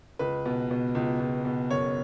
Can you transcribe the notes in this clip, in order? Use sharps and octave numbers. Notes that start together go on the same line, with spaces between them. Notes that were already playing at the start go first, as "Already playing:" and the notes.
C#2 B4
B2
B2
C#2
C#2
B2
F#1 C#5